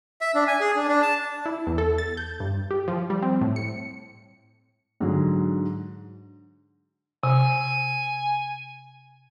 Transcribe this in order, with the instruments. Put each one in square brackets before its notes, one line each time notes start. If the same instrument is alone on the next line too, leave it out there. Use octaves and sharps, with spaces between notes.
[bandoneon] E5
D4
G#5
G#4
D4
D4
A5
[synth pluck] E4
E2
A4
A6
G6
G2
G4
F3
G3
C4
A2
C#7
[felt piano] G#2 D3 F#3
[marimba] C3 [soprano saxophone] G#5